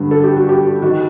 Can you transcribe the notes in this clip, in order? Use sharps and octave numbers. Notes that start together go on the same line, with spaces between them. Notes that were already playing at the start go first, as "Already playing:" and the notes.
Already playing: G2 D3 D4
A4
G4
F#4
G4
D#3 F#4